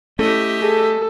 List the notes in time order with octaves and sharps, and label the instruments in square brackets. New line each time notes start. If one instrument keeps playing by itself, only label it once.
[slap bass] A3 [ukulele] C#4 E4 A4 [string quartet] G4 D#5 E5
[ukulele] G#4 [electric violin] A4